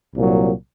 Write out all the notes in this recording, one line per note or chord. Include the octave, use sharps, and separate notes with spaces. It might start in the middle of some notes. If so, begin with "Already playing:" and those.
C2 A#2 F#3